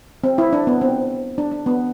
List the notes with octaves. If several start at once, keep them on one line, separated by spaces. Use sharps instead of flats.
C4
E4
D4
B3
C4
D4
D4
B3